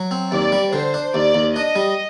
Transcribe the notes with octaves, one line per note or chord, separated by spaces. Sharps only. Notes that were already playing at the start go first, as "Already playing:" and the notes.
Already playing: F#3
C4
D#2 D5
G3
D3 C5
D4
D#2 D5
D#2
D4 D#5
G3